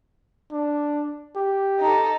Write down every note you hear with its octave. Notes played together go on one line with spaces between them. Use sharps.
D4
G4
D#4 A4